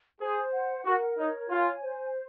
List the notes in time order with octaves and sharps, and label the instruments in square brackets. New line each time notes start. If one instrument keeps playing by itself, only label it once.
[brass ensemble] G#4 [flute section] C5
[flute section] F#5
[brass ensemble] F#4 [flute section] A#4
[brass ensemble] D#4 [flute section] C#5
[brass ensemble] F4 [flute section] G#5
[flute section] C5